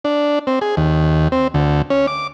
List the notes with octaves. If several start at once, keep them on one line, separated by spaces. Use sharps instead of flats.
D4
C4
G#4
D#2
C4
D2
C#4
D6